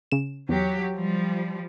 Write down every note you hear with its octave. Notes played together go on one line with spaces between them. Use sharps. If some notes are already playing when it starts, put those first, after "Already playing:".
C#3 E7
E2 F#3 G4
F3 G3